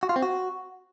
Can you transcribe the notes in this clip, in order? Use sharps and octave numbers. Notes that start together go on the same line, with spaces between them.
F#4
F4
C4
F#4